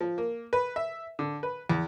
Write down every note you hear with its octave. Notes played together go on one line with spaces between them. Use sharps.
F3
A#3
B4
E5
D3
B4
E2